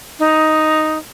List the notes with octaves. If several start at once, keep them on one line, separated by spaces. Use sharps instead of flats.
D#4